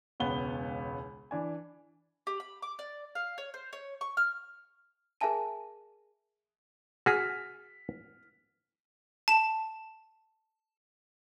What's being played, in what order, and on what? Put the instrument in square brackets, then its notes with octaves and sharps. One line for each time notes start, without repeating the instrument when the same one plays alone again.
[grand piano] E1 C#2 B3 G7
E3 D4 G#5
[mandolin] G4
B5
D6
D5
F5
C#5
C5
C#5
C#6
F6
[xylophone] G#4 A#4 E5 G#5 A5 D#7
[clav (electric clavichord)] F#4 G#4 [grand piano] F6 B6
[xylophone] A5 E7